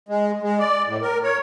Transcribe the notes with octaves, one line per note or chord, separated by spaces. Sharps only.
G#3
G#3
D5
A2
A#4
C#5